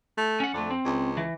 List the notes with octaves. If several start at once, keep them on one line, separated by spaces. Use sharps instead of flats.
A3
C#4 F#5
F2 A3 D4
C4
C#2
E3